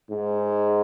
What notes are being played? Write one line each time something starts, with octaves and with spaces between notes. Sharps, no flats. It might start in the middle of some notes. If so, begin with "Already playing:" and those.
G#2